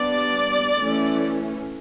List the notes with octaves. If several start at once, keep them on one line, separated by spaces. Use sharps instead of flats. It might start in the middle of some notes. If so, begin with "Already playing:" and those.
Already playing: G3 B3 D4 D5
E3 A3 C#4